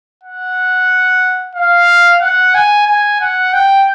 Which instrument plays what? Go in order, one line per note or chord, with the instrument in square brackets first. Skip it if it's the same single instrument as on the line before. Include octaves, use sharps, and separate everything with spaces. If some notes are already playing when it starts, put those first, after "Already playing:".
[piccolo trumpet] F#5
F5
F#5
G#5
G#5
F#5
G5